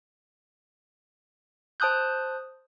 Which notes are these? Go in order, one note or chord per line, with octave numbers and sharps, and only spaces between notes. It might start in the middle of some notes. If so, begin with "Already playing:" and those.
C5 A5 D#6 F#6 G6